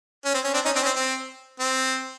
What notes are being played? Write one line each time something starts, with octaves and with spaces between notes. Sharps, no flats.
C#4
C4
C#4
C4 D4
C#4 D#4
C4 D4
C#4
C4
C4
C4